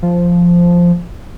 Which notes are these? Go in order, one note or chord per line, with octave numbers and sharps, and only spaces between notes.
F3